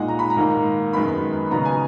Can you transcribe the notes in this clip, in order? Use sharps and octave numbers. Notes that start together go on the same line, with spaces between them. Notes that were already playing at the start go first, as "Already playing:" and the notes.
Already playing: A#2 G#3 D#4 F#5
A#5
B5
A#5
G#2 D#3 A#3
F#2 D#3 G#3 B3 B5
C#3 F#3 B3 D#4 A#5
G#5